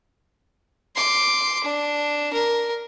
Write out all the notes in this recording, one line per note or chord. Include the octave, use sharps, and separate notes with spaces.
C6 D6
D4
A#4